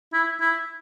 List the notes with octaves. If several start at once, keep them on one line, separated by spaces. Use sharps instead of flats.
E4
E4